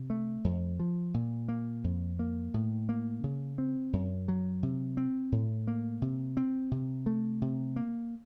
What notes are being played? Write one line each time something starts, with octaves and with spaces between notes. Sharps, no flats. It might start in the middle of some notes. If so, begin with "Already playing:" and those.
Already playing: C3
A3
F2
F3
A#2
A#3
F2
A#3
A2
A#3
C#3
C4
F#2
F#3
C3
C4
A2
A#3
C3
C4
C3
A3
C3
A#3